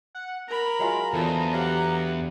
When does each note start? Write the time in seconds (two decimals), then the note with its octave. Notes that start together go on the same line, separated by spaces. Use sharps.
0.15 F#5
0.48 A#4 A#5 B5
0.79 F#3 G#3 F4
1.14 E2 D3 F3 F#3 A5
1.53 F#3 G4 F5 F#5